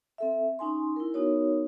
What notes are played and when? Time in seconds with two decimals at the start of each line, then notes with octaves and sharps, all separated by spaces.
0.18 C4 A4 E5
0.59 C#4 D#4 G#5 C6
0.96 E4 A#4
1.14 B3 D#4 F#4 A#4 C#5